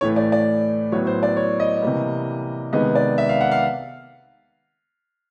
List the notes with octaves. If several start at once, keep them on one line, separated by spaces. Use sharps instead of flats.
A2 E3 A3 C#5
D5
D5
A2 F#3 B3 C#5
C5
D5
C#5
D#5
C3 E3 G3 A#3
C3 D#3 G#3 B3 D#5
D5
E5
F5
F#5
F5